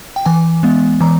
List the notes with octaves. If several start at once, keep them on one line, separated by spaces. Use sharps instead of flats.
G5
E3 G#5
G#3 B3
E3 A#5